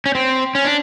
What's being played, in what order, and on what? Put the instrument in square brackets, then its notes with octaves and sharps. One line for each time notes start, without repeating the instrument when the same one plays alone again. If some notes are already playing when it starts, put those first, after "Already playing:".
[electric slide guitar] C#4
C4
C#4
D4